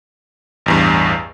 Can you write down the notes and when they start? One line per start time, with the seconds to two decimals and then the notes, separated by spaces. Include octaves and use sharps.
0.66 A1 E2 G2